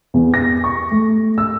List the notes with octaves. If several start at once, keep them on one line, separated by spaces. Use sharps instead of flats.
E2
A#6
C#6
A3
E6